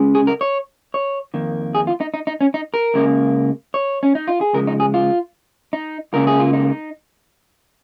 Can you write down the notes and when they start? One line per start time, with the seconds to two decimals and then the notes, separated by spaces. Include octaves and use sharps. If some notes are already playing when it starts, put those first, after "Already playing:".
Already playing: C#2 C#3 G#3
0.15 G#4
0.27 A#4
0.41 C#5
0.94 C#5
1.34 F2 D#3 A#3
1.75 G#4
1.87 F4
2.01 D#4
2.14 D#4
2.27 D#4
2.41 C#4
2.54 D#4
2.74 A#4
2.94 C#2 C#3 A#3
3.74 C#5
4.03 C#4
4.15 D#4
4.27 F4
4.41 G#4
4.53 C#2 C#3 F3 G#3 A#4
4.67 D#4
4.80 G#4
4.94 F4
5.73 D#4
6.13 C#2 C#3 A#3 A#4
6.27 G#4
6.40 F4
6.53 D#4